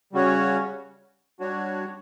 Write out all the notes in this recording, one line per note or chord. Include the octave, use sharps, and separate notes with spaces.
C#3 G3 C#4 F#4 C#5
G3 D4 F#4 C#5